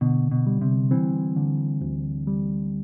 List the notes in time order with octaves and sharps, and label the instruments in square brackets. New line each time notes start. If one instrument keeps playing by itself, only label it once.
[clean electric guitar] B2 [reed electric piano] D3
[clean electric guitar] B2
[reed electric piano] G3
[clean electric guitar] C3
[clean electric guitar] E3 [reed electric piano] C4
[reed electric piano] D3
D2
G3